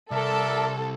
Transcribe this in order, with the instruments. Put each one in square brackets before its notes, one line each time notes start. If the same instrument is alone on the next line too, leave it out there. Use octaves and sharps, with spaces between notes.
[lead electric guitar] C2 [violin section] A4 [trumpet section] A#4 D5 E5